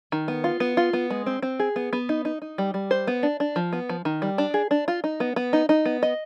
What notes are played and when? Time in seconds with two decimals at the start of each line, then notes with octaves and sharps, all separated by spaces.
0.12 D#3
0.28 B3
0.44 F4
0.60 B3
0.77 F4
0.93 B3
1.10 G#3
1.26 C4
1.42 C4
1.59 G#4
1.76 B3
1.93 B3
2.09 D#4
2.25 D#4
2.42 D#4
2.58 G3
2.74 G3
2.91 C5
3.07 B3
3.23 D4
3.40 D4
3.56 F3
3.73 B3
3.89 F3
4.05 D#3
4.22 G3
4.38 D4
4.54 G#4
4.71 D4
4.88 F4
5.04 D#4
5.20 B3
5.36 B3
5.53 D#4
5.69 D#4
5.85 B3
6.03 D#5